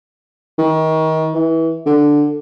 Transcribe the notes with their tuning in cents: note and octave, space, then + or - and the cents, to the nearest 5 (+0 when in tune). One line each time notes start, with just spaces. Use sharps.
D#3 +30
E3 -20
D3 +5